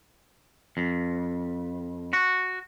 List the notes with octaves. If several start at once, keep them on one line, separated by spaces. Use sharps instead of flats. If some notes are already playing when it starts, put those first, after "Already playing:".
F2
F#4